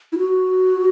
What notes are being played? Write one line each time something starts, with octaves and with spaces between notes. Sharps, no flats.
E4
F#4